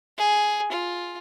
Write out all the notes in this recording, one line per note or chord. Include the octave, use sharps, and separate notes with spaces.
G#4
F4